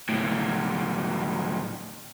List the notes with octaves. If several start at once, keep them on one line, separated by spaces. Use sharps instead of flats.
C#2 A2